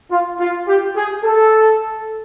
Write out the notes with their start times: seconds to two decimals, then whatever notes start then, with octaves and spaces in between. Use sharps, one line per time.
0.11 F4
0.39 F4
0.68 G4
0.96 G#4
1.24 A4